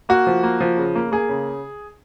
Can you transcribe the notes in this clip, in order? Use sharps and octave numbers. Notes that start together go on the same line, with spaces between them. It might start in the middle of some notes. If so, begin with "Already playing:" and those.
A#3 F#4
F3
A#3
F3
C#3
A#3
A#3 G#4
C#3